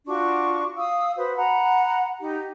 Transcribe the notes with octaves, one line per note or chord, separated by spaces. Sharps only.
D4 F4 F#4 C#6
F5 D#6 E6
F#4 B4 C5
F#5 A#5 B5
D#4 G4